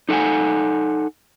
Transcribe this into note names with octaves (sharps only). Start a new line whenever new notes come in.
D#4 A4 F5 F#5 G#5